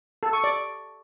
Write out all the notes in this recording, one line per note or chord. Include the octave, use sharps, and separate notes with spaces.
A4
C#6
D5